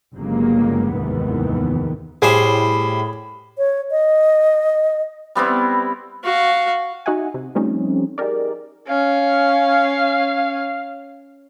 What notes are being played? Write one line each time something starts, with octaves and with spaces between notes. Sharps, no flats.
G1 G2 C#3 F#3 G#3 A#3
F1 D#2 G#2 D#3 E3 B3
A2 G3 G#4 C5 B5
C#5
D#5
G3 B3 C4 E4
F#4 F5
D#4 F#4 D#5 E5 F#5 G#5
C3
F3 G3 A3 C4 C#4 D#4
D#4 G4 G#4 A#4 D5
C#4 F5